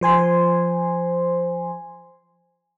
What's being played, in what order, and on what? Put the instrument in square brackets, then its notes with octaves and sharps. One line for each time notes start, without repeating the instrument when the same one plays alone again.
[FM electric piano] F3 C5 G#5 C6